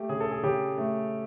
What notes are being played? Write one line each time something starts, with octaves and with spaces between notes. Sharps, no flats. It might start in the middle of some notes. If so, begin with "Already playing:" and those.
Already playing: A3 G4
C#3 G#4
A4
G#4
C#3 G4
A3